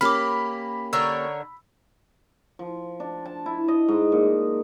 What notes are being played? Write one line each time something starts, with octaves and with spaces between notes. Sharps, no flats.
A#3 C#4 G4 B5 D6 F6
D3 A#4 C#5 E6
F3
D4
A5
E4
D#5
G#2
A#2